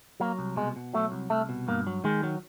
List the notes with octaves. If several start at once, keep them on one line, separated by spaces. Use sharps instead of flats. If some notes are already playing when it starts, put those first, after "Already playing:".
F#3 A#3
C2
B2 G#3
B2
F#3 A3
C2
C2 A3
B2
G2 A#3
F#3
D#3 G#3
F#3